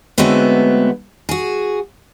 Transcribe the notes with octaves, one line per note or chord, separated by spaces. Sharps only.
D3 F#3 G#3 A3 B3 C4
F#4 G#4